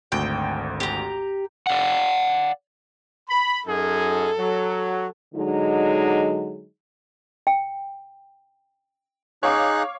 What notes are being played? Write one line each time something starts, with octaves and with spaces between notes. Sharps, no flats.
G#1 D2 G5 D7
G4 A#5
D5 F5 F#5
B5
F#2 D#4 G#4 A4
F#3
D3 F#3 G#3 D#4
G5
D#4 G#4 C#5 F5 D6 F#6